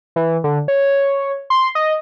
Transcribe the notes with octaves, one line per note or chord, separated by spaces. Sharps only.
E3
D3
C#5
C6
D#5